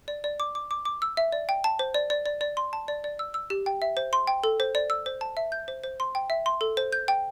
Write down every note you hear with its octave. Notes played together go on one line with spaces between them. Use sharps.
D5
D5
D6
D6
D6
D6
E6
E5
D5
G5
A5
C5
D5
D5
D5
D5
C6
A5
D5
D5
E6
E6
G4
G5
E5
C5
C6
G5
A4
C5
D5
E6
C5
A5
E5
G6
C5
C5
C6
G5
E5
C6
A4
C5
G6
G5